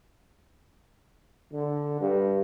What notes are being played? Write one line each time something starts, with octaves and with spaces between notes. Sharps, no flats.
D3
G2